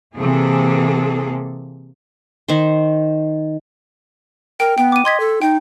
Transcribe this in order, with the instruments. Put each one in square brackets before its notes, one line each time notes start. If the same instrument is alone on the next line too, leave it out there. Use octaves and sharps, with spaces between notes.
[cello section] C3 E3 A#3 G#4 A4
[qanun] D#3 C5
[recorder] A#4 [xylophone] G5
[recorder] B3 [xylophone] G5
[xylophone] D6 D#7
[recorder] D#5 [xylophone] C6 G#6 B6
[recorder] A4
[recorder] D#4 [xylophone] G5